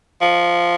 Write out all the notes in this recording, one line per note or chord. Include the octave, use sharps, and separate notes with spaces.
F3